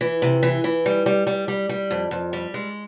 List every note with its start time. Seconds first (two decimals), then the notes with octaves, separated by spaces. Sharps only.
0.01 E3
0.22 C3
0.43 E3
0.64 E3
0.86 G3
1.06 G3
1.27 G3
1.48 G3
1.69 G3
1.91 F2
2.11 F2
2.33 G3
2.54 G#3